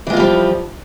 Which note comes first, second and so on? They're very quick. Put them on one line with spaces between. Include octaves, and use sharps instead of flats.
E3 G#3 F4 G3 F3